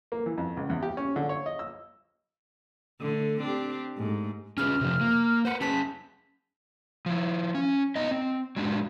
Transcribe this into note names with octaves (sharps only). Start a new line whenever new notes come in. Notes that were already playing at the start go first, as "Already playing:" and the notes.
A#3
E3
F2
C#2
E2
G4
C#4
D3
C#5
D#5
E6
D3 A3
C4 D4 G4
G#2 A3
C#4 G#4 B4 F6
C3 F3
A#3
B4 C5 F#5
C#4 G#4 A5 B6
F3 E4
C#4
B3 D#4 D#5
C4
F#3 G#3 D4 G4